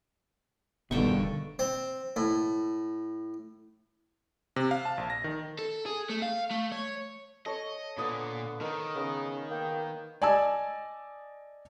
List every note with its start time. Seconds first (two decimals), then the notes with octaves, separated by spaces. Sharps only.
0.91 E1 G2 B2 D3 D#3 G5 C#6
1.59 C4
2.16 A2
4.56 C3
4.71 F5
4.85 A5
4.98 A#1
5.10 A#6
5.24 D#3
5.59 A4
5.86 G#4
6.10 A3
6.22 F5
6.51 A3
6.72 C#5
7.46 A4 C#5 D#5
7.98 A#2 D3 B3 D#5
8.61 D#3 A#4 D#5
8.96 C#3 B3
9.51 A#3 G5
10.22 D5 D#5 G#5 A5 E6